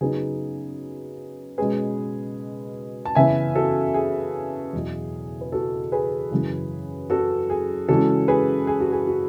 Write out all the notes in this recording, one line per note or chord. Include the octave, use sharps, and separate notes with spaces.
C#3 F#3 B3 D#4 G#4
B2 G#3 C#4 G#4 B4
A5
C#3 E3 B3 E5 G#5
F#4 A4
G#4
E2 B2 F#3
B4
F#4 A4
G#4 B4
F#2 C#3 E3
F#4 A4
G#4
C#3 E3 G#3 C#4 F#4 A4
G#4 B4
G#4
F#4
G#4
F#4